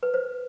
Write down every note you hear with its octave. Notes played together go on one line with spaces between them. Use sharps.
B4
C5